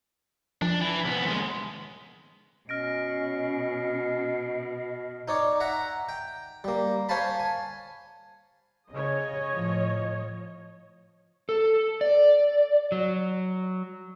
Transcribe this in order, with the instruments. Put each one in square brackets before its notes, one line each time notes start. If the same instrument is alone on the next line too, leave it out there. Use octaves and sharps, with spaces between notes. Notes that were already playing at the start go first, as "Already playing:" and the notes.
[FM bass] F3 [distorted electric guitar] D4
[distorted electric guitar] E3
C2 B3
D#2 G#3
[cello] B2 [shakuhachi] C#4 [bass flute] D#5 [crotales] F6 A#6 D7
[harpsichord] D#4 C#5 D5
E5 F#5 A#5
G5
G3 A#3
C5 C#5 F5 G#5 A5 B5
G#5
[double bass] C#3 [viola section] C#5 D#5
[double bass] A2 F3
[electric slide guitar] A4
D5
F#3